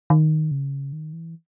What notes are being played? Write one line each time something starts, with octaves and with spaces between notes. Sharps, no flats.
D#3
C#3
D#3
E3